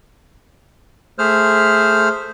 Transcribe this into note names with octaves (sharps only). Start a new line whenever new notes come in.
A3 G#4 C5 F6